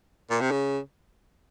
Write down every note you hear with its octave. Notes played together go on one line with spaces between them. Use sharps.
A#2
C3
C#3